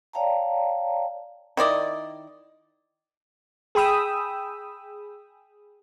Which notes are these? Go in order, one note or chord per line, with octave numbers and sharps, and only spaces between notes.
C#5 D5 F5 G5 A5 A#5
D#3 E4 D5 D#5
G#4 G5 B5 D#6 E6